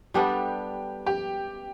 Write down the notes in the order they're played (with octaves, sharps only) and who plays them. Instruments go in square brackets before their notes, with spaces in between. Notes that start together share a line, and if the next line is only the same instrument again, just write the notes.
[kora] G3 B3 D4 A4 [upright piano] G4
[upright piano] G4